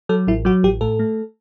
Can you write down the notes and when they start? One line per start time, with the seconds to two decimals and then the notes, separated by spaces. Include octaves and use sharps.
0.09 F#3 A4
0.27 A1 E4
0.45 F#3 F#4
0.63 A1 G4
0.81 A2 A4
0.99 A3